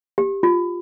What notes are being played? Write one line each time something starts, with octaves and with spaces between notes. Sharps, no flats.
G4
F4